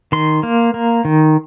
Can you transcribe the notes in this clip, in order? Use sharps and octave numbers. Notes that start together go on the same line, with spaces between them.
D#3 C6
A#3
A#3
D#3